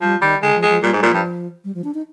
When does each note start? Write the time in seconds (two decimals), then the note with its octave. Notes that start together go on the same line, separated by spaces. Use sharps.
0.01 F3 G3
0.21 D#3 G3
0.42 D3 G#3
0.55 F3
0.62 G#3
0.69 F3
0.82 A#2 G3
0.93 G#2
0.97 G3
1.03 A#2
1.10 G2 F3
1.64 G3
1.75 F3
1.84 D4
1.94 D#4